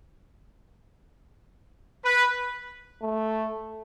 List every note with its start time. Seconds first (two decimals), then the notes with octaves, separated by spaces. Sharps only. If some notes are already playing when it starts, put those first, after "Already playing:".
2.04 B4
3.02 A3